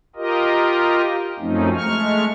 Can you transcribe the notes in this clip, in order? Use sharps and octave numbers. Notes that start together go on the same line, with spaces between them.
F4 G4 A#4 D#5
F#2 F3 A3 C4 C#4 D#4
G#3 A3 C#6 F6